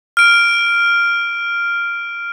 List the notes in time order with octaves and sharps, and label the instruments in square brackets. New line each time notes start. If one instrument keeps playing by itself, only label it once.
[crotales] F6 D7